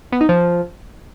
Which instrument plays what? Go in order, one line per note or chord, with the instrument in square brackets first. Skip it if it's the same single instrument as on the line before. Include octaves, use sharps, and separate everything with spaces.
[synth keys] B3
D#4
F3